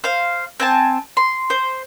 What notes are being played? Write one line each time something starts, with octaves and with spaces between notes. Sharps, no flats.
C5 F5
C4 G#5 A5
C6
C5